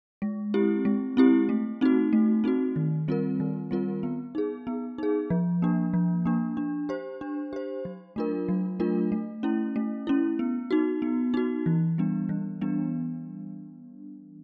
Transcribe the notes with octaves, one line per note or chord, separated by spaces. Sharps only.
G#3
C4 E4 G4
G#3
C4 E4 G4
A3
C4 D#4 F#4
A3
C4 D#4 F#4
D#3
G3 C4 F4 A#4
D#3
G3 C4 F4 A#4
B3
D#4 G#4
B3
D#4 G#4
F3
A#3 D4
F3
A#3 D4
D4
G4 C5
D4
G4 C5
F#3
A3 D4 F4 A#4
F#3
A3 D4 F4 A#4
A3
C#4 E4
A3
C#4 E4
B3
D#4 F#4
B3
D#4 F#4
E3
G3 B3 D4
E3
G3 B3 D4